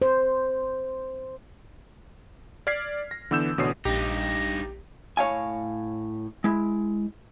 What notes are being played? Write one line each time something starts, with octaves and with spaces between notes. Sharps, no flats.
C5
D5 F6 G#6 B6 C7
A#6
D3 E3 B3 E6 G6 E7
A1 B2 D3 C#5 D#6 C7
A#1 G2 D#4 G4
A2 C#5 F5 G#5
G#3 E4